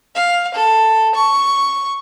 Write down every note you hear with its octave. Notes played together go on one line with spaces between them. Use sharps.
F5
A4
C#6